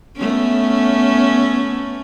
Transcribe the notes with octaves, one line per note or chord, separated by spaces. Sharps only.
A3 B3 C#4